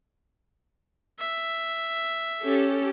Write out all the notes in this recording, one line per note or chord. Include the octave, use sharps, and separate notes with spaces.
E5
C#4 G4 A4